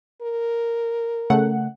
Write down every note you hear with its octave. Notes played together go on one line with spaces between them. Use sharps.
A#4
C#3 A3 F#5